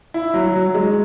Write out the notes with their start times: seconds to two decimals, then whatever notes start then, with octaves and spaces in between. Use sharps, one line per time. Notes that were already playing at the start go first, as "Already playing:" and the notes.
0.14 E4
0.34 F#3
0.55 F#3
0.74 G#3